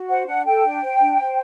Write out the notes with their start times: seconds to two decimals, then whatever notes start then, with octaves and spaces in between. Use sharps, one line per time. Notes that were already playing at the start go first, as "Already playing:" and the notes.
Already playing: F#4
0.08 C5 F#5
0.27 D4 F#5
0.45 A4 G5
0.63 D4
0.82 C5
1.00 D4
1.18 C5